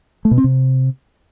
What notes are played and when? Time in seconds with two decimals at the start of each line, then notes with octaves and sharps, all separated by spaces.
0.25 A3
0.31 B2
0.38 C4
0.44 C3